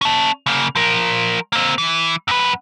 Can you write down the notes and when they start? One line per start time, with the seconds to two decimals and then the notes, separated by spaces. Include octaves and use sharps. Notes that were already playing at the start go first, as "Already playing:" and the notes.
0.01 C#4 A5
0.46 C#3 A#3
0.76 F3 A#4
1.53 A#3 C4
1.78 E3
2.28 F#2 B4